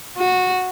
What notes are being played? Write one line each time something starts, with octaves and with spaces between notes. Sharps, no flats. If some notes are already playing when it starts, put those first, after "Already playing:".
F#4